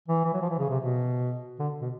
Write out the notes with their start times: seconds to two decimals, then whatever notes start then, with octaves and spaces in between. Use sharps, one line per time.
0.08 E3
0.25 E3
0.33 F#3
0.42 F3
0.50 E3
0.58 C#3
0.69 C3
0.80 B2
1.59 D3
1.81 B2